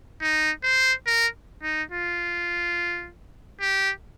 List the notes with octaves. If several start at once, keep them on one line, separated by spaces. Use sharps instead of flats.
D#4
C5
A#4
D#4
F4
G4